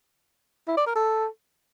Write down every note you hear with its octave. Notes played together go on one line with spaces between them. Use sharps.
E4
D5
A#4
A4